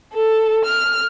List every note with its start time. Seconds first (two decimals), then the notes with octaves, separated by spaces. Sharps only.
0.14 A4
0.66 F6